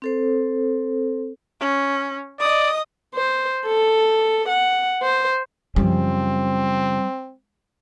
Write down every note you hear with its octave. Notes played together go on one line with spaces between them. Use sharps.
C4 A4 C5
C#4
D5 D#5 D#6
C5
A4
F#5
C5
F#2 C#3 F3 G3 C4